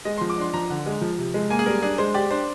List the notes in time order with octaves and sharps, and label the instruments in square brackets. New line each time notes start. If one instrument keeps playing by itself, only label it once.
[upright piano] G#3 [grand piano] D#5
[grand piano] C6
[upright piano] F3
[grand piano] D6
[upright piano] D4 [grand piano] C6
[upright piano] F3 [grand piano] A#5
[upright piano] D3
G#3
F3
C3
G#3
[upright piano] A#3 [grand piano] G#5
[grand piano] G#4
[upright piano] G3 [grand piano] A#4
[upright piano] D4 [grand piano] G#4
[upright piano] G#3 [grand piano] C5
[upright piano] G4 [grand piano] D5
[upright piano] D4 [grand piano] C5